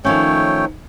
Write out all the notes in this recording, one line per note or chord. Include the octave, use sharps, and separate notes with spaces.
D#3 F3 A3 C#4 C#5 G5